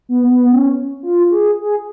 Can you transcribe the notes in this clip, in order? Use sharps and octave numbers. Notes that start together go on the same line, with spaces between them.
B3
B3
C#4
F4
G#4
G#4